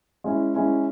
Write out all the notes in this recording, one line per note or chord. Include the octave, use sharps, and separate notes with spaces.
G#3 C#4 E4
G#3 C#4 E4